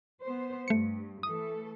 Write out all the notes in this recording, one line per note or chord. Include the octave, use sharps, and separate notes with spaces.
B3 C5
G2 A3 C#7
E3 A3 A4 D#6